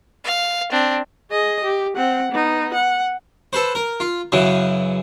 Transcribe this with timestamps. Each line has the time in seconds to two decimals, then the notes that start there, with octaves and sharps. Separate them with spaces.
0.25 F5
0.71 C4 D4
1.30 G#4 D#5
1.64 G4
1.96 C4 F#5
2.32 B3 D#4
2.74 F#5
3.53 A4 B4 C5
3.75 A#4
4.00 F4
4.32 F#2 C#3 E3 F#3